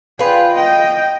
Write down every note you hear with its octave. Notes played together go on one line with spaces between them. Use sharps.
F4 G#4 B4 G5
D#5 G5